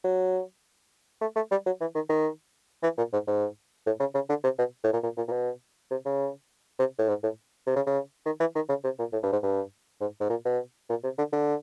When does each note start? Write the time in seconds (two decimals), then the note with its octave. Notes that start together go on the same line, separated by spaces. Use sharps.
0.04 F#3
1.21 A3
1.36 A3
1.51 G3
1.66 F#3
1.81 E3
1.95 D#3
2.09 D#3
2.83 E3
2.98 A#2
3.13 G#2
3.27 G#2
3.86 A2
4.00 C#3
4.15 C#3
4.29 D3
4.44 C3
4.59 B2
4.84 A2
4.93 A#2
5.03 A#2
5.17 A#2
5.28 A#2
5.32 B2
5.91 C3
6.05 C#3
6.79 C3
6.99 A2
7.09 G#2
7.23 A2
7.67 C3
7.76 C#3
7.87 C#3
8.26 D#3
8.40 E3
8.55 D#3
8.69 C#3
8.84 C3
8.99 A#2
9.13 A2
9.23 G2
9.32 G#2
9.43 G2
10.01 G#2
10.21 G#2
10.30 A#2
10.45 B2
10.90 A#2
11.04 C3
11.18 D3
11.33 D3